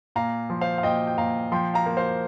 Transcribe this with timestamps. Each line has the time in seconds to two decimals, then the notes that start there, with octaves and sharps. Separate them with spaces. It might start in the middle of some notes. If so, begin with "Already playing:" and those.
0.16 A#2 F5 A#5
0.50 F3
0.61 C5 F5
0.78 F5
0.83 A#2 D#5 G5
1.07 G5
1.18 A#2 F5 A#5
1.52 F3 G5 C6
1.74 F5 A#5
1.86 A#3
1.97 C5 F5